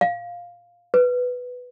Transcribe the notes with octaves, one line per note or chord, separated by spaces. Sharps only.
F5
B4